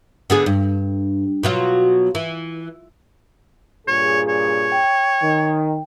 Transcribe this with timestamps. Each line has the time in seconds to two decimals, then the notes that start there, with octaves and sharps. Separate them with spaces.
0.30 D3 B3 G#4
0.46 G2
1.43 B2 F#3 F4
2.15 E3
3.88 G2 A#2 G#4 C#5
4.29 C#5
4.72 G5
5.23 D#3